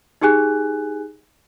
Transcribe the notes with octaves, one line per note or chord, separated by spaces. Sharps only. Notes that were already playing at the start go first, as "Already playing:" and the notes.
D#4 G4 G#4 G#5 F#6